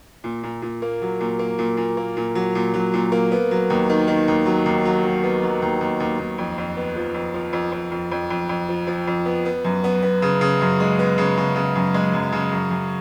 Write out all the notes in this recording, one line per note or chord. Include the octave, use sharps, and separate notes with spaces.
A#2
A#2
A#2
A#3
F#3
A#2
A#3
A#2
A#2
A#3
A#2
F#3
A#2
F#3
A#2
A#3
B3
F#3
D#2
D#3
D#3
D#2
F#3
D#2
F#3
F#3
B3
F#3
D#2
D#2
D#2
D#2
F2
F2
B3
F3
F2
F3
F2
F2
F2
F2
F2
F2
F3
F3
F2
B3
B3
F#2
B3
B3
C#3
C#3
F#2
G#3
B3
C#3
C#3
C#3
F#2
G#3
F#2
C#3
F#2
F#2